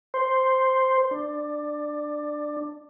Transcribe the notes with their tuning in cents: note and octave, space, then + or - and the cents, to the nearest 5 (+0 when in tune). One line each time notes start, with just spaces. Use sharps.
C5 +0
D4 +15